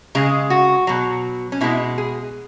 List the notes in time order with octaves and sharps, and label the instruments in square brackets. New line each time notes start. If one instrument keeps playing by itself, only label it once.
[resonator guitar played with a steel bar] C#3 G#3 G#4
F#4
B2 F#3
C#4
B2 G#3 E4
G#4